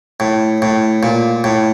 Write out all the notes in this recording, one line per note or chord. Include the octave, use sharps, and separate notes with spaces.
A2
A2
A#2
A2